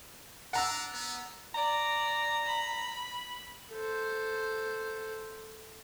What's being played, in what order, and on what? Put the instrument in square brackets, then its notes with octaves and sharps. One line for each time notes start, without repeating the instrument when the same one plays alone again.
[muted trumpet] D4 [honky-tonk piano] F#5 A#5 E6
[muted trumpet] B3
[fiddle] D5 [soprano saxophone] A#5
[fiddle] B5
[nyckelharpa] A4 C5